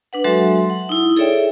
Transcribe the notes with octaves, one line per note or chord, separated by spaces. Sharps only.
D4 B4 F#5
F#3 G#3 F#4 A4 E5 C6
F#5
D#4 E4
G#4 A4 C#5 D5 E5 G5